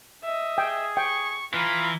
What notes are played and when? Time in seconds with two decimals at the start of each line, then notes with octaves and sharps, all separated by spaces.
0.23 D#5 E5
0.58 G#4 G5
0.97 G5 C#6
1.54 E3 F4 A#5 B5